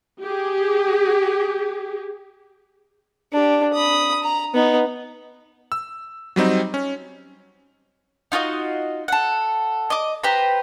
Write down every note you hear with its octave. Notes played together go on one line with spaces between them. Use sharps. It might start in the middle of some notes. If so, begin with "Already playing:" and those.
G4 G#4
D4 G4
B5 D#6
A#5
B3 D#4
E6
F#3 G3 C4 D#4
C#4
D#4 F4 F#4 D#5
A4 F#5
D#5 D6
G4 B4 C5 A#5